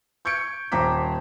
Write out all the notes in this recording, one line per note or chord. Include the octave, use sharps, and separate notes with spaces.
C#6 G6 G#6 C#7 D7
D#1 C5 A#5 D6 B6